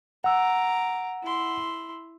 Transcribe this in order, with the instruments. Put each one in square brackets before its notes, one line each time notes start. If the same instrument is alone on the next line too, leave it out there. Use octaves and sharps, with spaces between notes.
[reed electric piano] F#5 E6 [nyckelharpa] A#5 D6
[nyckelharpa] E4 C6